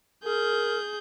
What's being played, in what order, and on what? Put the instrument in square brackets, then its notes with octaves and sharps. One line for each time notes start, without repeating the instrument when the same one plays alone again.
[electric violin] G#4 G6 [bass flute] A#4